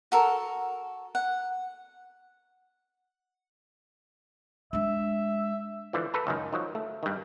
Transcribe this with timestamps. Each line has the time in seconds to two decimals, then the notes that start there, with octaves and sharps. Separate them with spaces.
0.12 F#4 A4 A#4
1.15 F#5
4.73 G#3 D4 E5
5.93 D3 E3 F3
6.14 A4 B4 A#5
6.27 C#2 F#2 D#3
6.52 D#3 F3 F#3
6.75 A3
7.03 G2 D#3